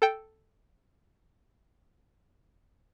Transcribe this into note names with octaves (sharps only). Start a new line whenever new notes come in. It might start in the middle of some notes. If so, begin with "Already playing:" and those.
A4 G5